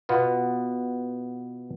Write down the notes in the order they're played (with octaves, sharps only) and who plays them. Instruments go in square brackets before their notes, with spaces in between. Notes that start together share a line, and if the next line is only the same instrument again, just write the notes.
[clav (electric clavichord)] B2 B3 F4